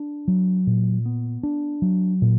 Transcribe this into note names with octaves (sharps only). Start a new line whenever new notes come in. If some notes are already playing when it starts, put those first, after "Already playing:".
Already playing: D4
F#3
A#2
B3
D4
F#3
A#2